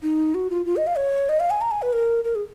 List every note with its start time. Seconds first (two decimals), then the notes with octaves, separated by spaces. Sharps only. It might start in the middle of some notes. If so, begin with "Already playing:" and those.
0.03 D#4
0.35 F#4
0.50 F4
0.66 F4
0.77 D#5
0.87 F5
0.97 C#5
1.29 D#5
1.40 F5
1.50 G#5
1.61 A#5
1.71 G#5
1.82 B4
1.93 A#4
2.24 A#4
2.35 G#4